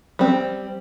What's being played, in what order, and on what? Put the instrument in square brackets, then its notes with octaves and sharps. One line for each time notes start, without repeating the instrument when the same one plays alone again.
[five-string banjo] G3 C4